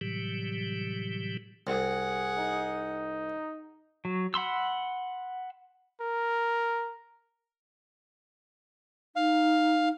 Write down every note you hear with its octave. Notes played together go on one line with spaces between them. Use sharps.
A2 C3 E3 F#3 G3 G4
C2 G#4 F#5
D#4
F#3
F#5 B5 C6 E6
A#4
D#4 F5